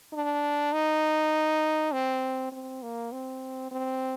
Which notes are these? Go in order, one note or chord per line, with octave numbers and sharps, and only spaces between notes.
D4
D#4
C4
C4
A#3
C4
C4